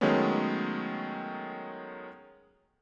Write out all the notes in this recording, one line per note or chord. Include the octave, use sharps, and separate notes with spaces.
D#3 F#3 G#3 A3 B3 C#4